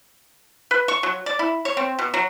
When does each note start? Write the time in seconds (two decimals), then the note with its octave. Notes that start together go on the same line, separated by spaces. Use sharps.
0.71 B4
0.88 C#6
1.03 F#3
1.26 D5
1.39 E4
1.65 C#5
1.77 C4
1.99 B2
2.14 F#3